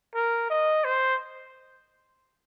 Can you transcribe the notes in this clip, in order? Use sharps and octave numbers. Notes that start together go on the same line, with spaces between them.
A#4
D#5
C5